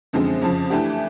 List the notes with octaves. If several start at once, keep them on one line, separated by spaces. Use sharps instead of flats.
F#2 D3 F3 G#3 C4
F2 C#3 F3
E3 A3 D4 G4